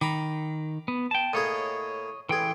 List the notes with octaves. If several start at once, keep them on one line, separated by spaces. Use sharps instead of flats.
D#3 A#5 B5 D6
B3
G5 A5
A2 A#3 G#4 C#5 D#5
A1 E3 G#4 G5